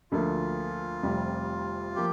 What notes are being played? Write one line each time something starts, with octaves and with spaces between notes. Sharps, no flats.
D2 D3 F3 A#3 F4
F1 F2 C3 G3
F3 A#3 G4